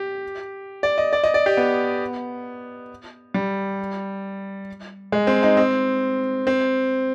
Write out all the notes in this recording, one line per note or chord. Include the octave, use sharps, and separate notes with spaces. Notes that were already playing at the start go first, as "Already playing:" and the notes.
Already playing: G4
D5
D#5
D5
D#5
D5
G4
B3
G3
G#3
C4
D#4
C4
C4